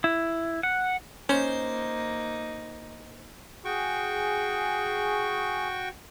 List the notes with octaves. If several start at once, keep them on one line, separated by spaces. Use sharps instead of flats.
E4
F#5
A#3 C#4 D#4 C5
F#4 G#4 G5 C#6